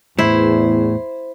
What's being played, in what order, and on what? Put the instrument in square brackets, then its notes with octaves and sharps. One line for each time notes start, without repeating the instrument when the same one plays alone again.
[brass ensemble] E2 [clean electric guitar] A2 [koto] E4 [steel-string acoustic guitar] C5